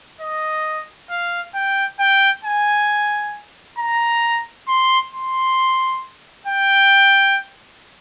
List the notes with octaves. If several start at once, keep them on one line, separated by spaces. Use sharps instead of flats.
D#5
F5
G5
G5
G#5
A#5
C6
C6
G5